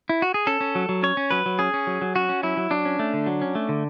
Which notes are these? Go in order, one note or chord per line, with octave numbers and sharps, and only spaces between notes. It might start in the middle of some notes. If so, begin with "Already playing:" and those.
E4
F#4
G#4
C#4 A4
C#4
F#3
F#3
C#4 C#5
C#4
F#3 B4
F#3
C#4 G#4
C#4
F#3
F#3
C#4 F#4
C#4
F#3 E4
F#3
F#3 D4
C#4
A3
D3
F#3
C#4
A3
D3